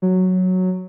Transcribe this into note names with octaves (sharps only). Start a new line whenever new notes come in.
F#3